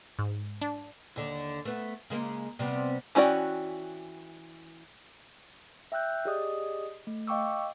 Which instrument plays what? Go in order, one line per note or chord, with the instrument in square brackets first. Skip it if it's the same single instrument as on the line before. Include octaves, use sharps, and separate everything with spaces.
[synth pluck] G#2
D4
[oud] D#2 D3
A3 B3
C#3 G#3 A#3
C3 G3 B3
[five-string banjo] E3 C#4 F#4 D5 G5
[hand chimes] E5 G5 E6 F#6 G6
G4 G#4 D5 D#5 D#6
A3
D#5 F5 G5 C#6 D6 E6